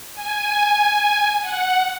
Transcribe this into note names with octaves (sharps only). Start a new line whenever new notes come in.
G#5
F#5